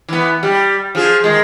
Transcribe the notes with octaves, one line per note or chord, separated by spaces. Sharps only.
E3 B3
G3
F3 G#4
D#3 G#3